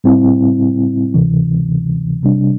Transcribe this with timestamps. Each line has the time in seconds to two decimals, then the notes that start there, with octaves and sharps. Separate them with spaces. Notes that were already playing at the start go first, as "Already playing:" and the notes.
0.04 A2 G3 C4 E4
1.14 D2 C3 E3
2.23 C3 G3 D4